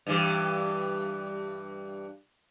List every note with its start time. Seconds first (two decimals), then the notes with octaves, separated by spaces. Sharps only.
0.07 G2 E3 G4